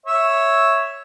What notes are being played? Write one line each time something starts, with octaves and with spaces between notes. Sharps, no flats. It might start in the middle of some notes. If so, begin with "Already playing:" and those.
C#5 E5